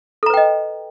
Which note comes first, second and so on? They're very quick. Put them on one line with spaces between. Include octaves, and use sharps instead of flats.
A4 A#5 B4 G5 D#5